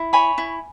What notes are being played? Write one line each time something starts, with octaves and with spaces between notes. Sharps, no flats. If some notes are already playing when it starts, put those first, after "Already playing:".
Already playing: E4
C#5 G#5 B5
E4